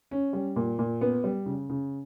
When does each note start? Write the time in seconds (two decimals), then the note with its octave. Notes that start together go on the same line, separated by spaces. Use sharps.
0.11 C#4
0.33 G3
0.56 A#2
0.79 A#2
1.01 B3
1.24 G3
1.46 C#3
1.69 C#3